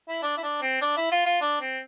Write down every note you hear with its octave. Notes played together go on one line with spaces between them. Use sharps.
E4
D4
E4
D4
C4
D4
E4
F4
F4
D4
C4